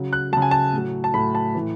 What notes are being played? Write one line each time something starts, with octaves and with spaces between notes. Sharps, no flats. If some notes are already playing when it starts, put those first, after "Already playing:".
Already playing: C#3 F#3
F#6
C#3 F#3 A5
G#5
A5
A2 F#3
A5
A2 F#3 B5
A5
A2 E3